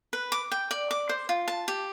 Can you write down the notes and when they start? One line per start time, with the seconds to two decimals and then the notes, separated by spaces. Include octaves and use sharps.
0.13 B4
0.32 D6
0.52 G5
0.71 D5
0.91 D6
1.09 C5
1.29 F4
1.48 A5
1.68 G4